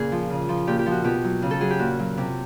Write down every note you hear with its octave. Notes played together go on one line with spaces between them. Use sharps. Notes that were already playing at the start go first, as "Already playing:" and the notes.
Already playing: A#2 C#3 G#4
F3
C#3
F3
A#2 G4
G4
F3
F#4
B2 G4
F#3
C#3
A4
F#3 G#4
G4
A#2 F#4
F#3
C3